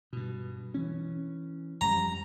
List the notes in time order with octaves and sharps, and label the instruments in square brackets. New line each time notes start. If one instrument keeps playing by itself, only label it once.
[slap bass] G2 B2
E3 C#4
[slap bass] F2 G3 [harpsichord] A#5